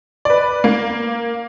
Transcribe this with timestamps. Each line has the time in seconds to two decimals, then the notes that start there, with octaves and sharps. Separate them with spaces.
0.25 B4 D5
0.64 A#3